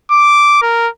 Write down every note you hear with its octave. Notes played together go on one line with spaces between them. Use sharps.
D6
A#4